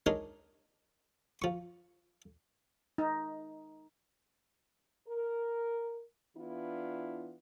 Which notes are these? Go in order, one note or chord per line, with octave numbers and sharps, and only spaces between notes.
G#3 D4 D#4 A#4 C#5
F3 C#6
D#4
A#4
E3 B3 D4 E4 F4